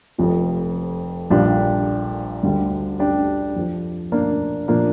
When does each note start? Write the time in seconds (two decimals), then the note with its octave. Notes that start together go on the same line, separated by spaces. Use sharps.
0.18 F1 F2 F3
1.30 A#1 A#2 G3 D4 G4
2.43 D2 D3 G3
2.99 D4 G4
3.56 F2 F3
4.12 A#3 D4
4.68 A#2 F3 A#3 D4